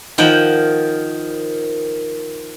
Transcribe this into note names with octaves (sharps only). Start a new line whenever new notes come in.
D#3 F3 F#5 G5